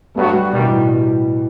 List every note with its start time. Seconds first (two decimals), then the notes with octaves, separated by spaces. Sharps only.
0.15 G2 F#3 A3 B3 F#4
0.34 G3
0.52 G2 B2 D#3 G3
0.61 A2
0.72 A2